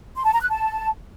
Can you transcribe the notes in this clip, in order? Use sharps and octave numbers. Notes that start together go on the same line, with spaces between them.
C6
A5
A#5
F#6
A5